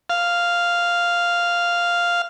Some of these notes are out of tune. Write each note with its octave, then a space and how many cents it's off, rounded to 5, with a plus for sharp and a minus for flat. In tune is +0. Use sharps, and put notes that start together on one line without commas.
F5 -5